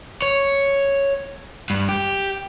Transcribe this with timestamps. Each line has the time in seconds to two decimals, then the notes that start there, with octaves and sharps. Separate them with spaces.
0.22 C#5
1.70 G2
1.89 G4